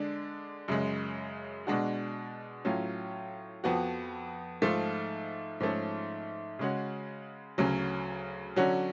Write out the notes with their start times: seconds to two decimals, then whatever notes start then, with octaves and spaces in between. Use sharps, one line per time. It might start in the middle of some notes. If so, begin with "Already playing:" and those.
Already playing: D3 G#3 D4
0.68 F#2 C#3 G#3
1.67 B2 G#3 D4 F#4
2.65 A2 F#3 C#4 F4
3.64 F2 F3 B3 F#4
4.62 G#2 F3 A3 F4
5.60 G#2 F3 A3 C#4
6.59 C#3 G#3 C#4 F#4
7.58 D2 C#3 F#3 C#4
8.56 D3 F#3 C#4 F#4